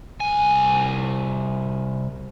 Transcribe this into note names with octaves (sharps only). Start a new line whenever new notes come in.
C2 G#5